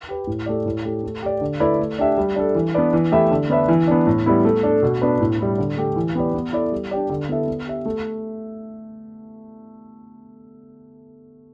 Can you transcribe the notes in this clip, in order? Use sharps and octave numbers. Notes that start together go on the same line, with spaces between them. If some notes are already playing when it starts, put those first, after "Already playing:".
G4 B4
A2
A3 G4 D5
A2
A3 G4
A3
G4 D5
D3
A3 E4 B4 D5
A3
D4 G4 E5
G3
D4 A4
E3
B3 D4 B4 D5
E3
A3 E4 G4 E5
D3
B3 D4 B4 E5
E3
B3 D4
A2
G3 B3 E4
A3
D4 A4
B2
B3 D4 B4
A2
G3 E4
D3
A3 G4
E3
B3 G4 B4 D5
B3
E4 A4 D5
G3
D4 G4 D5
D3
B3 E4 A4 E5
B3
G4 E5
A3